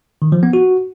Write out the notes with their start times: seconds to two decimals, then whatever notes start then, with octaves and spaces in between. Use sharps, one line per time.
0.22 D#3
0.32 F3
0.43 B3
0.53 F#4